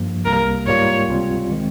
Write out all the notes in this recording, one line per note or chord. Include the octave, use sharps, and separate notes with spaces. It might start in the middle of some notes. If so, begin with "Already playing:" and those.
Already playing: G2 F3 A#3
C2 C3 G3 A#3 A#4
G#2 G3 A#3 F4 C#5
C#2 C3 G3 C4 F4
D#3 G#3 C4